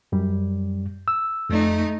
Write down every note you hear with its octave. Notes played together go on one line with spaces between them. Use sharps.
F#2 G3
E6
F2 A3 D#4